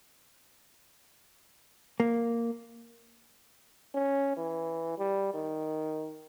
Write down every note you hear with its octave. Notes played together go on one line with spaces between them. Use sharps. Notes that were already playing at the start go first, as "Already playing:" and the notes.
A#3
C#4
E3
G3
D#3